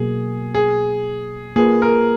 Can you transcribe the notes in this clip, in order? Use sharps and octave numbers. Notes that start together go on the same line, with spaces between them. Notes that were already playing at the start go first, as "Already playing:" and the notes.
Already playing: B2 F#3 A#3 G#4
G#4
A#3 F4 G#4 B4
A#4